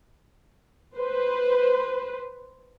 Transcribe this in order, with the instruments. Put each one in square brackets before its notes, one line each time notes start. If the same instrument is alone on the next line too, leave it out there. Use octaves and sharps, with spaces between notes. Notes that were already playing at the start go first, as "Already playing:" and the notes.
[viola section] B4 C5